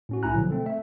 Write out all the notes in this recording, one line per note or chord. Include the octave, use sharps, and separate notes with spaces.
A2 C#4 F#4
C2 A2 E4 G#5 A#5 F#6
B2 D3 F3 F#3
A3 C4 A4
A3 E5